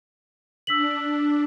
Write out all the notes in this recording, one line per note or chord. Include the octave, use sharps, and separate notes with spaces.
D4 E6 B6 F#7